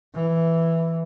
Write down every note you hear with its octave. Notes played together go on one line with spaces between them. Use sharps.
E3